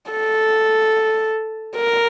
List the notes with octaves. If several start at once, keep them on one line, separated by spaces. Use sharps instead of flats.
A4
A#4